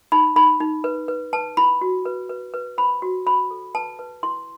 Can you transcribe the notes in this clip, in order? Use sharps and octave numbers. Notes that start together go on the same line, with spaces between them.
D#4 B5
D#4 B5
D#4
B4
B4
B4 A5
E4 B5
F#4
B4
B4
B4
C5 B5
F#4
C5 B5
A4
B4 A5
B4
E4 C6